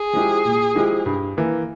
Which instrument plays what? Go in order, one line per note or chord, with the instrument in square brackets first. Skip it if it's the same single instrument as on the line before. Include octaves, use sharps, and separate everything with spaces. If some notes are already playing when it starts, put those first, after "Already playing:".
Already playing: [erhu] G#4
[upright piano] F3 G#3 E4 G4
A#2
F3 G#3 E4 G4
G2
E3 A#3